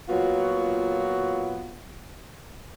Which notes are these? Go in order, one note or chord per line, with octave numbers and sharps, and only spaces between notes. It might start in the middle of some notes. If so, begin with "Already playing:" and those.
A#2 F#3 B3 F4 F#4